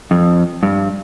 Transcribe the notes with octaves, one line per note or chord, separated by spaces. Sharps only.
F2
G2